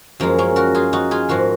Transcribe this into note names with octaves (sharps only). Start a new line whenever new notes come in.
F#2 F3 G#3 A#3
A#3 C#4
F#4 A#4
F4 G#4
D#4 F#4
F4 G#4
G#2 F3 A#3 F#4 A#4